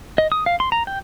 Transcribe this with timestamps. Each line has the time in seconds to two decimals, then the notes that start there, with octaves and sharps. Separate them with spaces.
0.18 D#5
0.32 D#6
0.46 F5
0.60 C6
0.72 A#5
0.87 G5